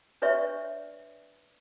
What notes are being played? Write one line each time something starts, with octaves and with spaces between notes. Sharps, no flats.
D4 B4 C#5 D5 E5 C#6